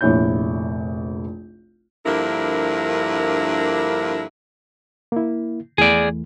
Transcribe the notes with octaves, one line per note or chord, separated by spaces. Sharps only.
F1 A#1 E4 C#5 G6
G2 D3 F3 A#3 E4 A#4
A#3 E4
E2 E3 A3 G#4 D5